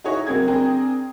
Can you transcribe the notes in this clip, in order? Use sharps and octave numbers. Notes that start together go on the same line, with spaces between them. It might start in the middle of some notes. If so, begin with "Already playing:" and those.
D#4 E4 F#4 G#4 C#5 D#5
F#3 A#3 C4 G#4 G#6
C4 D4 G#4 A#4 G5